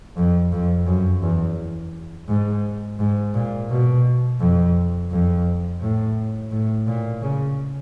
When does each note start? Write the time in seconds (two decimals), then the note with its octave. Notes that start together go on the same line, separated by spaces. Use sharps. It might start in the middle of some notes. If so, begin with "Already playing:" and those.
0.17 F2
0.52 F2
0.87 F#2
1.22 E2
2.28 G#2
2.99 G#2
3.35 A#2
3.70 B2
4.40 F2
5.11 F2
5.82 A2
6.52 A2
6.87 A#2
7.22 C#3